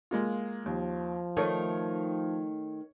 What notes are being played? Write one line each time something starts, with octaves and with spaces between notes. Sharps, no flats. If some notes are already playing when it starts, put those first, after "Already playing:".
G#3 A#3 F4
D#2 F3
D#3 A3 C#5